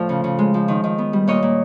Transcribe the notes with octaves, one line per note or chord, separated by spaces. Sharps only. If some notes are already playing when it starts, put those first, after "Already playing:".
Already playing: A2 F3 A3 C5 D5
C#3
C#3
G#3
F3
D#3
D#3
B3
G3
A#2 C#5 D#5
A#2